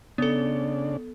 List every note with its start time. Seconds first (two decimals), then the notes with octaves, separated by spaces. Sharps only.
0.18 C#3 B3 D4 A4